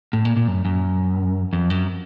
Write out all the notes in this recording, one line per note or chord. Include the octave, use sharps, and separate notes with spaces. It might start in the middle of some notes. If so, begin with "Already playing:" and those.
A2
A#2
A#2
F#2
F#2
F2
F#2